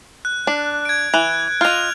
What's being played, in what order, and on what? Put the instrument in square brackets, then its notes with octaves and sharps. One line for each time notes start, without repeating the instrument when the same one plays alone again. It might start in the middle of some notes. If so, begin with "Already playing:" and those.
[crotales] F#6
[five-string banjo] D4
[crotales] G#6 D7
[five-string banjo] E3 [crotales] F#6
[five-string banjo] F4 D#5 [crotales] F6 F7